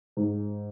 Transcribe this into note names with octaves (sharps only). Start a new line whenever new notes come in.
G#2